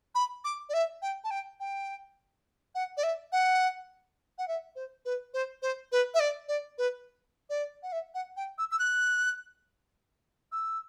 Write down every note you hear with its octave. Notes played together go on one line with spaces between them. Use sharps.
B5
D6
D5
E5
G5
A5
G5
G5
F#5
D5
E5
F#5
F#5
E5
C5
B4
C5
C5
B4
E5
D5
D5
B4
D5
F#5
E5
F#5
G5
E6
E6
F#6
E6